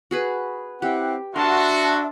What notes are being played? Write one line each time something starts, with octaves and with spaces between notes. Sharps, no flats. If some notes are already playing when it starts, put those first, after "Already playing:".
F#4 G#4 B4
C4 E4 G4 F#5
D4 F#4 A#4 E5 A5 C6